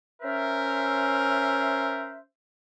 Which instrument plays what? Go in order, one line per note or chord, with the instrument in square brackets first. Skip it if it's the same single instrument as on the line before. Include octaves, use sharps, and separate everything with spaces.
[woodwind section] C#4 C5 E5 [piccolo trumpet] A#4